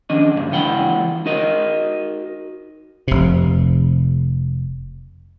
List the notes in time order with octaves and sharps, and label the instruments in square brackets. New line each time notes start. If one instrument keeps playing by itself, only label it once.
[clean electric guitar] D#3 C#4 D4 D#5
C#2 G2 C#3
C#2 E3 F#5 G5 B5
D#4 F#4 A#4 D#5
[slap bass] F1 C3